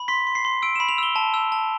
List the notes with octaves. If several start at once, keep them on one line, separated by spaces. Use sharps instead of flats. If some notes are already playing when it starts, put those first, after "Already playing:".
Already playing: B5
C6 B6
C6
C7
C6
E6 D7
E7
B5
F7
E6 G7
A5
E6
A5